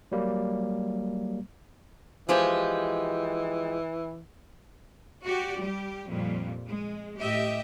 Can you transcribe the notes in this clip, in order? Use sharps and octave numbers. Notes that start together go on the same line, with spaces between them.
F#3 G3 A#3
E3 F3 G#3 G4
F#4 G4 D5
G3 G4
F2 A#2 G3
G#3
A2 G4 D#5 E5